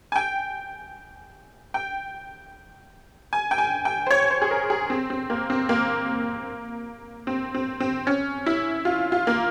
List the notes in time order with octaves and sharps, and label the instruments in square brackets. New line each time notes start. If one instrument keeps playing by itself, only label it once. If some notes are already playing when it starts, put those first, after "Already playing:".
[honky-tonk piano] G#5
G5
G5
G#5
G5
G#5
G5
C5
C#5
C5
G#4
A#4
G#4
C4
C4
A#3
C4
A#3
C4
C4
C4
C#4
E4
F4
F4
A#3